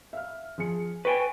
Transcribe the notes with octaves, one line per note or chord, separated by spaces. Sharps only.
E5 F5 F6
F3 G#4 C#7
B4 G5 G#5 C#6